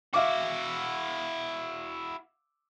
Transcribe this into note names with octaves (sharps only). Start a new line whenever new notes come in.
E4 F#4 E5 F5 D6